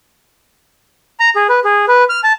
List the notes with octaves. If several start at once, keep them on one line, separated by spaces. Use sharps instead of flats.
A#5
G#4
B4
G#4
B4
F6
A5